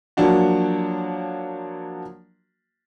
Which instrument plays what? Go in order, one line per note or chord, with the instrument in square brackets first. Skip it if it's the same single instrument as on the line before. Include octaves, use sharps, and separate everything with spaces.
[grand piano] F3 F#3 A#3 D4 F#4